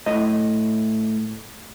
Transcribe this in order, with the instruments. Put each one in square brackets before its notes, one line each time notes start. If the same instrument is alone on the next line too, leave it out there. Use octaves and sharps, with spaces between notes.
[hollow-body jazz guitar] A2 D#5